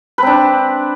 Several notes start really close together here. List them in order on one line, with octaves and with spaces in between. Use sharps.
B4 C4 D4